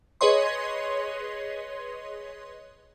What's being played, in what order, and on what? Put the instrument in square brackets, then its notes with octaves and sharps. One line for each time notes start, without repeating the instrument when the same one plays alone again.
[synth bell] G#4 B4 C#5 D#5 C6